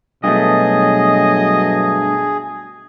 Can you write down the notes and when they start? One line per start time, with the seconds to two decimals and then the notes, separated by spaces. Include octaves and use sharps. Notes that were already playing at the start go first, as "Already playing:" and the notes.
0.24 G2 B2 F#3 A3 G#4 D#5